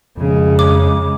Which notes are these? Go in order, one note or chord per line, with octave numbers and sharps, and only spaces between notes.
F2 C#3 G#3
D6